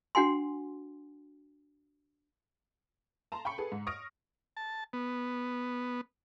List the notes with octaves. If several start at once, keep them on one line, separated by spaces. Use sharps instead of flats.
D4 F#4 F#5 G#5 C6
A5 A#5 C6
G5 B5 C#6 C#7
G#4 A4 B4
G#2
C#6 D#6 F6 A#6 D7
A5
B3